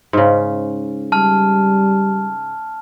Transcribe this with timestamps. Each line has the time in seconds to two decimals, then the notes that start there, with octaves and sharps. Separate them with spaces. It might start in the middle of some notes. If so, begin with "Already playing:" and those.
0.13 G#2 C#3
1.12 G3 A5 F6